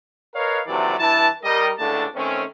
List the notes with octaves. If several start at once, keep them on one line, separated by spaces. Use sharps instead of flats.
A#4 B4 C#5 D#5 F5
D#2 C3 E3 F#3 A3 D5
G2 E3 E4 A5
G3 A#4 D#5
C#2 A2 D3 A3 D4 A5
D#3 A3 C4 C#4